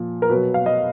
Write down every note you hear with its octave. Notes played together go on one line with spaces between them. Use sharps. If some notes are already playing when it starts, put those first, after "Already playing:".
Already playing: A#2 F3
A#4
B2 F#3 B4
F5
D#5